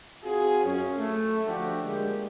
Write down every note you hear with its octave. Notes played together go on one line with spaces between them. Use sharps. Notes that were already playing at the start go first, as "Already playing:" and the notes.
C4 F4 F#4 G#4
F#2 C#4
A3
D3 F3 D4 F#4 G4
G#3 A#3 D4 G4